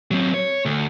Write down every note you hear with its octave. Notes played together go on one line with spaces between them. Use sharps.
F#3 C4
C#5
D2